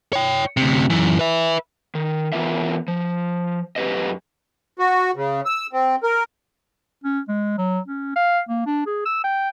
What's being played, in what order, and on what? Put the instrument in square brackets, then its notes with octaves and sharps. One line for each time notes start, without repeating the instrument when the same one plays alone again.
[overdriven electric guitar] C#5 G5
D2 C3
F#2 E3
B4 E5
[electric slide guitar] D#3
E3 F3 B3 F4 A#4 E5
F3
F#2 G4 B4 D#5
[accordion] F#4
C#3
E6
C4
A#4
[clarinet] C#4
G#3
F#3
C#4
F5
A#3
D4
G#4
E6
G5